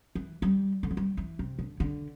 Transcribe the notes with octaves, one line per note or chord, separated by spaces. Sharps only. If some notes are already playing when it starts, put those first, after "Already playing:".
E3
G3
D3
E3
G3
E3
C3
D3
D3